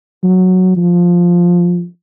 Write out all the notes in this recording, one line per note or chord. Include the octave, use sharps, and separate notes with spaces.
F#3
F3